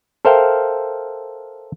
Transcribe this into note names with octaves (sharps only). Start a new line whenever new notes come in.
A4 A#4 C5 E5 F5 G5